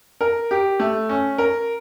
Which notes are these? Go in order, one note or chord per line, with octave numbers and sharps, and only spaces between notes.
A#4
G4
A3
C#4
A#4